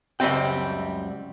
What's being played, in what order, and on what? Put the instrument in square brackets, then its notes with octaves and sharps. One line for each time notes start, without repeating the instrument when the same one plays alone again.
[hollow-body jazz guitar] C#2 F#2 G3 C4 G5